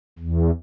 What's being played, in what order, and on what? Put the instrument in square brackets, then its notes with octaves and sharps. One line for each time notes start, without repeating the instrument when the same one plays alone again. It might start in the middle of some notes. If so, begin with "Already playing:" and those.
[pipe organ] E2